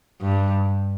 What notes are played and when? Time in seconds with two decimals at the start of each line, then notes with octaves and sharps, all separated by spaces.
0.21 G2